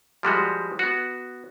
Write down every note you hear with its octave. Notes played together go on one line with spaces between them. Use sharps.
F3 G3 G#3 F#4
B3 F#4